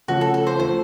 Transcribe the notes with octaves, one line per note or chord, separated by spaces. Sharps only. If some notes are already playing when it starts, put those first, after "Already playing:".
C#3 F3 A3 F#4
A4
A4
C5
F3 A3 C5